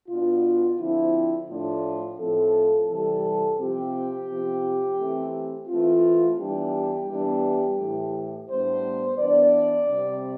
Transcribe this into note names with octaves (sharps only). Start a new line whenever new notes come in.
B2 B3 D4 F4
D3 F3 C4 E4
A2 F3 A3 D4 F4
A2 F3 C4 A4
C3 E3 G3 A4
C3 F3 C4 G4
C3 F3 C4
E3 A3 C4
E3 A3 C4 F4
E3 G3 B3 D4 G4
E3 G3 B3 D4
A2 E3 A3
A2 G3 B3 D4 C5
E3 B3 D4 D5
C3 G3 C4